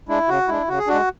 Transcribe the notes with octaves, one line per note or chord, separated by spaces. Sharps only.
G#3 D4 E4
C#3 F#4
G#3 D4 E4
C#3 F#4
G#4
G#3 D4 F#4